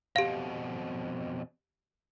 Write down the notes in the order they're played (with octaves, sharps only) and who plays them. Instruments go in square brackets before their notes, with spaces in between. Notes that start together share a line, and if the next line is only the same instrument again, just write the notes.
[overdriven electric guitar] F2 B2 [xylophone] G4 F5